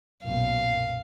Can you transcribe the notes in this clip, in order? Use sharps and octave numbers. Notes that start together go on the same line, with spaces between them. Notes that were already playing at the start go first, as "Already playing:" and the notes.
B1 F#2 A#2 F5